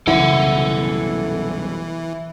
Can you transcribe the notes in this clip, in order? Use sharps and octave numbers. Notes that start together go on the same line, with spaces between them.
C2 F#2 B2 E3 E4 A4 F#5